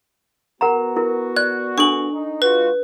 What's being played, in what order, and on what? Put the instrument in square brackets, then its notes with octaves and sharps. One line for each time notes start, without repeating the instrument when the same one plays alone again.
[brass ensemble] B3 F#4 [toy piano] A#4 F#5 A#5
[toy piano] E4 A#4
[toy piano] D5 [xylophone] F#6
[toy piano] D4 A4 G#5 [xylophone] C#6 F#7
[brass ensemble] D#4
[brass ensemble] G#3 F4 F#4 [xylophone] B4